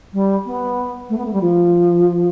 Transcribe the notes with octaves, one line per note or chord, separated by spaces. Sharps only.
G3
B3
A3
B3
A3
G3
F3